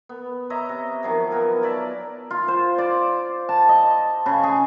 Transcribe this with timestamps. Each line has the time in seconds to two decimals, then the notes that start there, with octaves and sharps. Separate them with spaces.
0.09 B3
0.50 C#5 D#5 E5 A#5
0.69 C3
1.03 D#3 F3 F#3
1.31 B3 A#4 G#5
1.62 C#5 D5 E5 A5
2.31 F4
2.48 C5
2.78 D5
3.49 A5
3.69 D#5
4.26 C#3
4.43 G#4